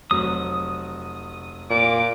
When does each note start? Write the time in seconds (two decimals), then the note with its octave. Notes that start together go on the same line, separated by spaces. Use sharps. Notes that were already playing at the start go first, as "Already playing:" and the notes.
0.11 F1 F#3 F#4 D#6
1.70 A#2 D6